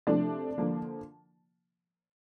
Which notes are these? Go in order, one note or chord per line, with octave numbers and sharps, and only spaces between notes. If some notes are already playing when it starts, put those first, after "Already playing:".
C3 F3 A3 D4 D5
D3 F3 A#3